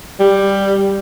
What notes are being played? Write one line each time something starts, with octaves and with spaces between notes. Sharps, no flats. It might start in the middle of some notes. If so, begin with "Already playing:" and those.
G3